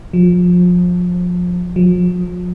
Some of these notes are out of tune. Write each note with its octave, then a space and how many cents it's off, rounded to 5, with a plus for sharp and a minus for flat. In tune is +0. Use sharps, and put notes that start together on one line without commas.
F3 +30
F3 +40